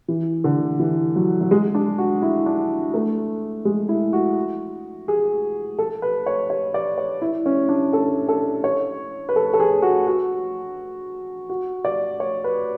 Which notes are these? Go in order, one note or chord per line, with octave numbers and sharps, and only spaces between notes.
E3
D3
E3
F#3
F#3
G#3
D4
F#4
E4
D4
A3
G#3
E4
F#4
G#4
A4
B4
C#5
C#5
D5
C#5
E4
C#4
D4
A4
A4
C#5
B4
A4
A4
G#4
F#4
F#4
F#4
D5
C#5
B4